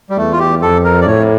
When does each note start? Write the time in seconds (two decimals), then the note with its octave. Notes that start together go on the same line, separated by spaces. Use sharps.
0.10 G3
0.17 E2 A3
0.32 F4
0.39 G4
0.62 F2 A4
0.84 A#4
1.01 D5
1.07 A2 C#5